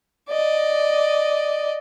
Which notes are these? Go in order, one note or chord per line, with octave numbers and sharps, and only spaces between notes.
D5 D#5